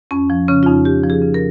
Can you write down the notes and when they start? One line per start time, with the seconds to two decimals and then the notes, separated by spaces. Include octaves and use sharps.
0.11 F2 C#4
0.30 F3
0.48 C#3 C#4
0.63 F4
0.67 F2 D#4
0.85 F2 G4
1.03 F3
1.10 G#4
1.22 C#3
1.34 A#4